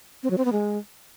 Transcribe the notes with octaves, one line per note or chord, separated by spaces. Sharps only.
C4
F#3
C4
B3
G#3